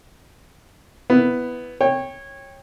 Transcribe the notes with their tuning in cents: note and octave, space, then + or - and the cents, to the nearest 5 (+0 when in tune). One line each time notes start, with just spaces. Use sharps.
B3 +5 E4 +0
C#5 -15 G5 +15